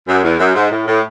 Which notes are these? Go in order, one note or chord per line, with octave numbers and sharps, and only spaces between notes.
F#2
E2
F#2
G#2
A2
A2